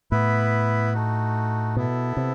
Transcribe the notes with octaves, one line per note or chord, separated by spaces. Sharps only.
A2 B3 E4 B4
A3 D#4 F#4
B2 B3 E4 A4
C3